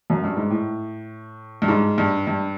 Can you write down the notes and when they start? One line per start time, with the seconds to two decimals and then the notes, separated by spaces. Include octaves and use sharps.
0.10 F#2
0.24 G2
0.37 G#2
0.50 A2
1.62 G2
1.68 G#2
1.98 G2
2.27 G2